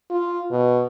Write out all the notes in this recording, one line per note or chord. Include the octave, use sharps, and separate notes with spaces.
F4
B2